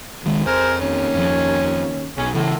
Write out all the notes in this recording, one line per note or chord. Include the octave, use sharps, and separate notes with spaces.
C#2 D#3 G#3
F2 G#4 A#4 C5
D#2 C#4
F2 F3
B1 C#4 G#4
A2 C#3 E3 A4